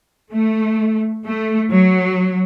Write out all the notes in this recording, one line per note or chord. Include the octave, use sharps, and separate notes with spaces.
A3
A3
F#3